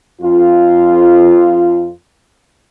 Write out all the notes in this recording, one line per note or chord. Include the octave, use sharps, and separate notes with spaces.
F2 F4